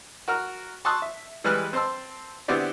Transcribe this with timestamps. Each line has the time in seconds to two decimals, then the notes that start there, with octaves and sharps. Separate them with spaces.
0.28 F#4 A#4 F6
0.85 A5 C6 C#6 D#6 E6 F#6
1.02 E5
1.44 E3 G3 G#3 B4 F6 F#6
1.73 C4 C5 A5 C6 E6
2.48 D3 B3 C4 E4 G4 D5